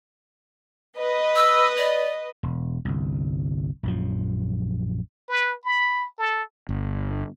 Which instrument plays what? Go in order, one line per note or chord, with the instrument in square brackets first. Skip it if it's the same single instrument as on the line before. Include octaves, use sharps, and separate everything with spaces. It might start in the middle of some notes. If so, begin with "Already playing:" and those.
[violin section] B4 D#5
[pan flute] E6
D5
[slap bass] E1
G1 C2
A#1 F#2 F3
[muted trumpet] B4
B5
A4
[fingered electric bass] G1